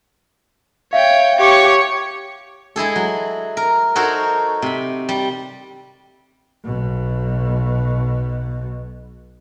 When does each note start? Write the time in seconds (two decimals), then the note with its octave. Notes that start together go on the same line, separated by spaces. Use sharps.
0.93 C#5 E5 F5 G5
1.39 G4 C#5 C#6
2.76 G#3 E4 G#4 A4
2.96 F#3
3.57 A#4
3.95 D#4 F#4 A4 A#4 C5 C#5
4.62 C3 B5
5.09 G3
6.65 B1 B2